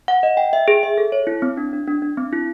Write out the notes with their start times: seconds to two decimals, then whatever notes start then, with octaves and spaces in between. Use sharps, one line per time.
0.08 F#5
0.23 D#5
0.37 G5
0.53 E5
0.68 G#4
0.83 E5
0.98 A4
1.12 C#5
1.27 E4
1.42 C4
1.57 D4
1.73 D4
1.88 D4
2.02 D4
2.18 C4
2.32 E4